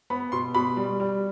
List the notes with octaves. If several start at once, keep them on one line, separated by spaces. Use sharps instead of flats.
B3 B5
B2 C6
B2 B5
G3
G3